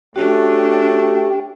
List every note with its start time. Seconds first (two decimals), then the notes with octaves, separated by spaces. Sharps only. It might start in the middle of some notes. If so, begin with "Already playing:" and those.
0.16 A3 C#4 D4 F#4 G4